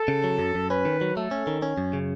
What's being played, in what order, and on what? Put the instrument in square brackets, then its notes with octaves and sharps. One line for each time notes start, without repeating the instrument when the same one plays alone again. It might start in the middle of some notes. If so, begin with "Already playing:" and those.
Already playing: [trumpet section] A4
[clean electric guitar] C#3
F#3
F#2
F#2
[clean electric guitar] C#4 [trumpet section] B4
[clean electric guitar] D#3
F#3
[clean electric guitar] A3 [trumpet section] A4
[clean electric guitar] C#4
D#3
C#4
F#2
C#3